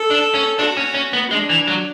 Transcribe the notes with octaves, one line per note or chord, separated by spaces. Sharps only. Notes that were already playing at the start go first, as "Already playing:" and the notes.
Already playing: A4
D4
C#4
D4 F#4
C#4
C#4
B3
G#3 D4
E3
F#3